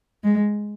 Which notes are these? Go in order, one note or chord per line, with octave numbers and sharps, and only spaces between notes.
G#3